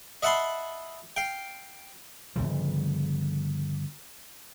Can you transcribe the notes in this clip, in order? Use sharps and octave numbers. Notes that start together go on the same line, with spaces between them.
D#5 E5 F#5 A5 B5 C6
F5 G5
G1 D#2 C#3 F3